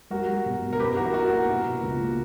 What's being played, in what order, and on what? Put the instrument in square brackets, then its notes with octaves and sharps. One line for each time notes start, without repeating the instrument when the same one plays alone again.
[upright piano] G3 [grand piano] F#4 A#4
[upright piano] G3
B2
B2
[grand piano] A#4
[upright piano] F#2 [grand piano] G4 B4
[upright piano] E3 [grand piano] F#4 A#4
[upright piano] E4 [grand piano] F#4 A#4
[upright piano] A#3
B2
B2
C#2
A#3